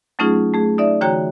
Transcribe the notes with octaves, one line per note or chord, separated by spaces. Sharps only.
F#3 A3 C#4 D#4 F4 G#4
A3 G#4
D#4 D5 E5
D3 E3 F#4 C#5 G5 A#5